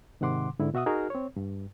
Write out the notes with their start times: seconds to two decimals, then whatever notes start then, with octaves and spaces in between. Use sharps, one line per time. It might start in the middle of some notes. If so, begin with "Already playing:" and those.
0.21 G#2 C3 D#3 F#5 C6 D6
0.59 G#2 D3 E4
0.74 B2 F#4 E5 F#5 D#6
0.86 D#4 F#4 G#4 A#4 F6
1.10 C4 C#5
1.36 G2